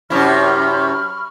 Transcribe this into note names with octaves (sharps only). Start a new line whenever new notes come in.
F#2 C3 E4 B5 C#6 F6